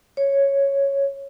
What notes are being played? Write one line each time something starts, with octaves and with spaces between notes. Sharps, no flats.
C#5